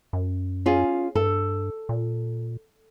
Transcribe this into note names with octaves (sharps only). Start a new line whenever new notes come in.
F#2
C#4 F4 G#4
G2 A4
A#2